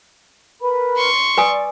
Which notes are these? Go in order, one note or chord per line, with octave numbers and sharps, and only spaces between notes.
A#4 B4 B5
C6 C#6
B4 D5 G#5 D#6